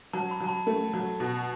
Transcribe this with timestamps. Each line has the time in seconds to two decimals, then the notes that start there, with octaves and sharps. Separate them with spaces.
0.13 F#3 A5
0.31 B5
0.40 F#3 A5
0.49 B5
0.67 A3
0.94 F#3
1.20 B2